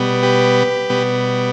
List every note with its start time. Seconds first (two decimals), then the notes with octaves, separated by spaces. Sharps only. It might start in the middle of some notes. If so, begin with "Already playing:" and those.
Already playing: B2 G3 B3
0.23 G4 B4
0.90 B2 G3 B3